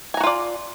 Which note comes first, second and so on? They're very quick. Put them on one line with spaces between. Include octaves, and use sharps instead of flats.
G#5 A#5 F#4 F4 D5